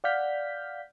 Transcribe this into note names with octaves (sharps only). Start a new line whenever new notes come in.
D5 F5 F#5 F6 G6 B6